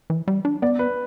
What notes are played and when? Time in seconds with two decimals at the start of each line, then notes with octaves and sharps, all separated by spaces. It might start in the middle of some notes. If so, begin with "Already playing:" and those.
0.10 E3
0.28 G3
0.45 D4
0.62 B3 D5
0.79 B4